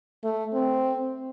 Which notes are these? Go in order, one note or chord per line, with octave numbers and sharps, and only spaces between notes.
A3
C4